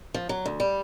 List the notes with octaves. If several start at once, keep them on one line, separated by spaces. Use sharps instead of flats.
F3
F#3
D2
G3